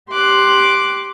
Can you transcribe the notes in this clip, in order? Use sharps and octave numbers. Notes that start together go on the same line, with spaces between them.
G4 C6 D6 F#6